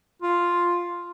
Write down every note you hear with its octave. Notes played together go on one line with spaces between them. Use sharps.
F4